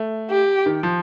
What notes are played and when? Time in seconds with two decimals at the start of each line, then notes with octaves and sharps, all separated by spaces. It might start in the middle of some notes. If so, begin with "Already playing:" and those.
Already playing: A3
0.30 G4
0.66 D#3
0.83 F3